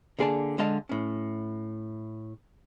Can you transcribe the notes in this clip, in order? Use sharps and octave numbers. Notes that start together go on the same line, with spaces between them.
D3 A#3 G#4 B4 D5 A5
D3 G#3 D#5 F5 A5
A2 C#4